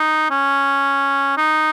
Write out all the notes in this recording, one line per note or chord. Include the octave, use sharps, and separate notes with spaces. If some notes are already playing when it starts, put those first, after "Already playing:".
Already playing: D#4
C#4
D#4